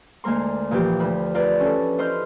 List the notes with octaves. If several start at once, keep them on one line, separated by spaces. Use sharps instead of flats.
D2 G#3 A#3 A#4 C6
A#2 E3 F3 G4
D2 B5
F4 A#4 B4 D5
C#4 D4 E4 A4
E4 C5 D#5 C6 F6 G6